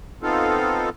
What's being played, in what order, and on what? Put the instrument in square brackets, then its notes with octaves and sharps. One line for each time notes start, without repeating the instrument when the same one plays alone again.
[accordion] B3 C4 D#4 F4 A4 F5